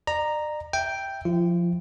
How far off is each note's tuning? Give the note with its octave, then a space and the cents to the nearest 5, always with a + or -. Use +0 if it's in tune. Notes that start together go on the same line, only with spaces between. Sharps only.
D5 +40 A#5 +0
E5 +0 G5 +0
F3 +0 F4 -40